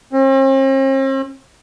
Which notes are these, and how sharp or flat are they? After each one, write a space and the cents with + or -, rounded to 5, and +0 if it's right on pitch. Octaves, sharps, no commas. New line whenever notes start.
C4 +45